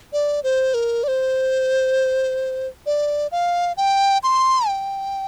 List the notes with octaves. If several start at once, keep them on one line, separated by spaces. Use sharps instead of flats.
D5
C5
A#4
D5
C5
D5
F5
G5
C6
G5